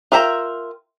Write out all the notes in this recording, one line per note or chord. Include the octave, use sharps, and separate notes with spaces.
F4 A#4 E5 G5 A#5